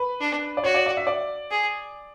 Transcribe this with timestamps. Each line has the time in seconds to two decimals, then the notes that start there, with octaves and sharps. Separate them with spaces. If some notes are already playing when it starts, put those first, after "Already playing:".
Already playing: B4
0.20 D4
0.57 D5
0.64 F#4 C#5
0.75 D5
0.86 D5
0.97 E5
1.07 D5
1.51 G#4